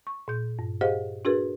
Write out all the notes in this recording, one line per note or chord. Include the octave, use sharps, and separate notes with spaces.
C#6
A#2 G6
G2
G4 G#4 C5 D#5 F5 F#5
D4 F#4 G#4 A#4 B4